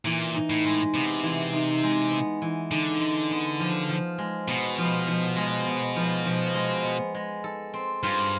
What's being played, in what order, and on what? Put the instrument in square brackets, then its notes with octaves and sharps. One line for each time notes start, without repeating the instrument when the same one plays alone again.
[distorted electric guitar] A#2 [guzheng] E3
[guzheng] D#4
[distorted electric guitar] A2
[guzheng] G#3
[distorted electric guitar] C3 [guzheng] B3
[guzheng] E3
D#4
G#3
B3
E3
[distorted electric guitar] D3 [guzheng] D#4
[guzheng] G#3
B3
F3
F3
G#3
[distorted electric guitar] B2 [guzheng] B3
[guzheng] F3
F3
G#3
B3
F3
F3
G#3
B3
G#3
A4
C4
[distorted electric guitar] G2 [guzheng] F4